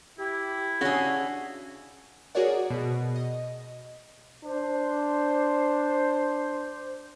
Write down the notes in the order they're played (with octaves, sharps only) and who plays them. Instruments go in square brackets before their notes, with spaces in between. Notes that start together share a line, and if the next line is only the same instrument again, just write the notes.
[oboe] E4 [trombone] G4
[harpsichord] C#3 [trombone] D4 [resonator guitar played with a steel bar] F#4 G#4
[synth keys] F#4 G#4 A#4 C#5 D5 F#5
B2
D#5
[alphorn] D4 [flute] C5